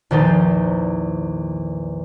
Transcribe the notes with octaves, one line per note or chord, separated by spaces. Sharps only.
A#1 E2 D#3 D#4 C5 A5